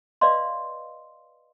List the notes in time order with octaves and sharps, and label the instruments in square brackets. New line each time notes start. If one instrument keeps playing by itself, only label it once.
[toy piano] B4 D5 D#5 F5 C6